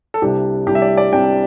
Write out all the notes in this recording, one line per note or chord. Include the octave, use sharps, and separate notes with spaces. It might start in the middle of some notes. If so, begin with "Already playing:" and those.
A4
C2 C3 G3 D4 G4
C2 C3 G3 D4 G4
E5
D5
D5
C2 C3 G3 D4 G5